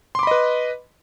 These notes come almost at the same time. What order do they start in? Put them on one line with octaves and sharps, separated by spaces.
C6 D6 B5 D#5 B4